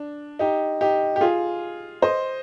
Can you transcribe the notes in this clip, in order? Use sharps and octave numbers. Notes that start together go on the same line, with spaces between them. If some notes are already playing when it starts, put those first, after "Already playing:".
Already playing: D4
D#4 G4
D#4 G4
G4
F4 G#4
C5 D#5